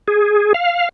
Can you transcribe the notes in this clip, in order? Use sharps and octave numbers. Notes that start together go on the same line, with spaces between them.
G#4
F5